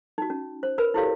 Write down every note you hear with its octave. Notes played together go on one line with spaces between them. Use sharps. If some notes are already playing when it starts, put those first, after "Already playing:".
D#4 F#4
C#4
C5
A#4 B4 B5
E4 F#4 G4 A4 C#5 F5